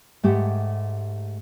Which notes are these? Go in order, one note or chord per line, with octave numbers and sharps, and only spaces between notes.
G#2 A3 G4 F#5